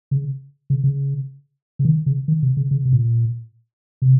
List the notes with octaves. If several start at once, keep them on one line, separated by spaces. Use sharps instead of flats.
C#3
C#3
C#3
C#3
D#3
C#3
D#3
C3
C#3
C#3
C3
A#2
C3